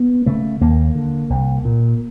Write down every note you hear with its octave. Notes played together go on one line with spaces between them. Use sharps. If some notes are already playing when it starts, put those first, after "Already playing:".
Already playing: B3
C#3 A3
D#2 A#3
D3
C2
A#2